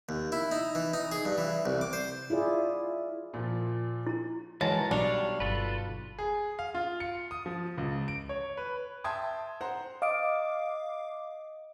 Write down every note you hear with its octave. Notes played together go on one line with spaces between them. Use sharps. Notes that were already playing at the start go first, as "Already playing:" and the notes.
D#2
E4
D#4
E3
D#4
G#4
G2
E3
C2
D6
C5
E4 F4 G#4 D5
A#2 F3
E4 A#5
E3 F#3 G#3 A#4 A5
B1 G3 D4 C#5 F5
G1 F4 A4 B4
G#4
F5
F4
C#7
D#6
F3
C#2
D7
C#5
B4
E5 G5 A5 C6 D#6 G#6
C5 F#5 A#5
D#5 F5 D6 D#6 D7